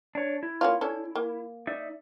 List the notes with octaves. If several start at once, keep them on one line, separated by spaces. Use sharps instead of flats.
D4 C#5
E4
A#3 C#4 F4
C#4 D4 A4
A#3
D#4 D5 E5